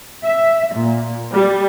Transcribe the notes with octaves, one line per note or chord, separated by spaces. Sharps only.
E5
A#2
G3